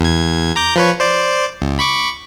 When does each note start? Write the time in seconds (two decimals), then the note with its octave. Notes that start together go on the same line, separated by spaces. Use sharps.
0.01 E2 G#6
0.56 A#5 D6 G6
0.76 F3 B4 C#5
1.00 C5 D5
1.62 C#2
1.79 B5 C#6 D6